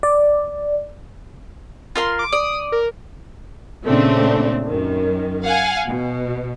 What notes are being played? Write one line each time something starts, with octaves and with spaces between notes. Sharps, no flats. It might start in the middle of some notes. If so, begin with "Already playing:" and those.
D5
F4 A#4 C6
D6
D5 D#6
A#4
A#2 C#3 A3 C4 D4
F#2 D#3
F5 F#5 G#5
B2